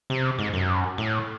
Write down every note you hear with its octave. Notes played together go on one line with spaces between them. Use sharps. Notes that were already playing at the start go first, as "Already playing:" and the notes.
C3
G#2
F#2
A2